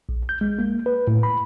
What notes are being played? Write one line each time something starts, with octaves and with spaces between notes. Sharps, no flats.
A#1
G6
G#3
A#3
B4
A2
B5